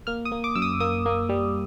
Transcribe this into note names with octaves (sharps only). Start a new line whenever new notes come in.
A#3 F6
D#6
A#3
D6
F#2 E6
D#6
A#3 D#6
A#3
G3